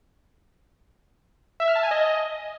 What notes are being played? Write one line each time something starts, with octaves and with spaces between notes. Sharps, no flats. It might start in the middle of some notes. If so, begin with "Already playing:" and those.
E5
F6
A5
G#5
D#5